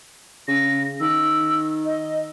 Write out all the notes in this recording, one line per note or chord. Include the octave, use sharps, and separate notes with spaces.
C#3 A#6
D#3 E6
D#5